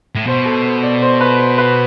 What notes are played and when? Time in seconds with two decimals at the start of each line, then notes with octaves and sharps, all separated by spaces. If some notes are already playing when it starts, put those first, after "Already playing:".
0.15 A2
0.27 B2 C5
0.45 A4
0.64 C5
0.83 D5
1.02 C5
1.21 B4
1.39 C5
1.58 B4